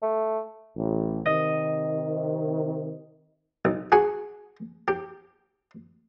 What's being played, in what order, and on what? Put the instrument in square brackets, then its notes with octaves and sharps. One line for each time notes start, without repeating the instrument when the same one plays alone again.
[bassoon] A3
[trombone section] A1
[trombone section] C3 D#3 [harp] D#5
[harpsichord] B1
F#4 G#4 G#5 C#6
G4